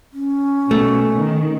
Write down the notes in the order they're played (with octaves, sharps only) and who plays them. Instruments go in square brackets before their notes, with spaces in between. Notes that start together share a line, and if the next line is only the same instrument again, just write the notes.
[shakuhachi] C#4
[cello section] B2 [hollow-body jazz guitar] A3
[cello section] D#3